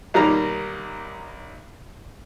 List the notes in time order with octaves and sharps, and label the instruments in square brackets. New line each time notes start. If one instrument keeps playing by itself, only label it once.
[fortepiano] B1 D#3 G3 A#3 A#5